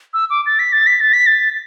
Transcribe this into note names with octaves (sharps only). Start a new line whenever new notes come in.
E6
D6
A6
B6
A6
B6
A6
B6
A6